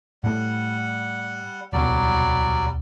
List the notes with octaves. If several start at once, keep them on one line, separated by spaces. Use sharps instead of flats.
A2 G3 A3 F#5
D#1 C#2 B2 F#3 G3 D5